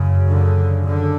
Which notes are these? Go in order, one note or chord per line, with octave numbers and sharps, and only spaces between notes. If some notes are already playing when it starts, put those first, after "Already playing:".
Already playing: F#2 C#3
D3
D3